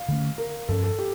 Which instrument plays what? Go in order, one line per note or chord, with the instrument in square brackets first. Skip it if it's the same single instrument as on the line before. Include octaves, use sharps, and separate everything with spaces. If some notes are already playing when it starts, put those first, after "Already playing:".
Already playing: [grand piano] F5
[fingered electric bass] D3 A3 C#4
[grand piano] A#4
[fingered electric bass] G2 F3 C#4 [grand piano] A4
[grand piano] A4
G4